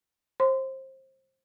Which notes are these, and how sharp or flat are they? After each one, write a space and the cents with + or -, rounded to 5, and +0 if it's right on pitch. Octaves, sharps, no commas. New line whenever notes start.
C5 +25 C6 -25